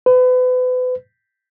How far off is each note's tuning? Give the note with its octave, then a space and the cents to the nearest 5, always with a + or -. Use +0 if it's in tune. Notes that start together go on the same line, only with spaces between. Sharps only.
B4 +35